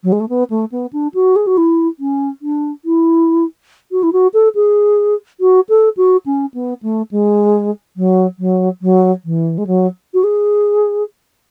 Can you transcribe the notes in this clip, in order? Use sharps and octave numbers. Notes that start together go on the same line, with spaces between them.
F#3
G#3
A3
B3
A3
B3
D4
F#4
G#4
F#4
E4
C#4
D4
E4
F#4
E4
F#4
A4
G#4
F#4
A4
F#4
C#4
B3
A3
G#3
F#3
F#3
F#3
E3
G#3
F#3
F#4
G#4